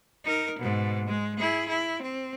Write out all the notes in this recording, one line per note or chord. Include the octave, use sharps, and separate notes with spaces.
D#4 A#4
G#2 B2
G#3
E4 G#4
E4
C4